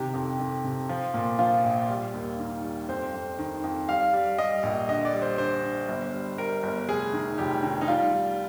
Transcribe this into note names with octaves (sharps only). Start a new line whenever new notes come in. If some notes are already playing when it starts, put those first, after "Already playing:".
Already playing: C3 D#3 G4
F2
F2
C3
F3
A#2
F3 F4
A#1
G3
D#2
D#3
G3
F2 C5
F2
D#3
F2
G3 F5
G3
G3 D#5
A#1
D3 D#5
D5
G3
C5
D3 C5
D3
G1
G3
G3 A#4
G1
F1 G#4
D#3
F1 G4
D#3
D#4
G3 F4
G3